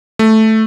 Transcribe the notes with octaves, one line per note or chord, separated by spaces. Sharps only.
A3